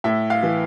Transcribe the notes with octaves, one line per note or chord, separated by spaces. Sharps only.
A2 E5
F5
E3